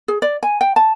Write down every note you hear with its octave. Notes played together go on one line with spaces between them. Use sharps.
G#4
D5
G#5
G5
A5